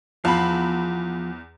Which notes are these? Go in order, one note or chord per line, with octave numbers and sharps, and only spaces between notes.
E2 F3 B5